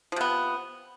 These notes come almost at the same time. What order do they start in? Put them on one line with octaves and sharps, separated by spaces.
F3 C3 B3